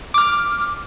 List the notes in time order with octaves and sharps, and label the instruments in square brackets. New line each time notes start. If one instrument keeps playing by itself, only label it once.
[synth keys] D6 F6